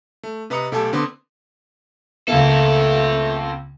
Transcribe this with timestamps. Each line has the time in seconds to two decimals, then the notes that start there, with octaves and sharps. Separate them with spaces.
0.23 A3
0.50 C3 B4 D#5 A#5 D#6 C#7
0.72 B1 A3 G4 A4 G#5 A5
0.93 D3 B3 C4 C6 D6 D#6
2.28 C#2 A3 A#3 C4 A4